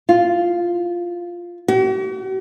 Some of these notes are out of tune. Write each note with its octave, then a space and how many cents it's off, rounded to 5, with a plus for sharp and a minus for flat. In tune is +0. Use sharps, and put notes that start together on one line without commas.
F4 +0
F#4 +45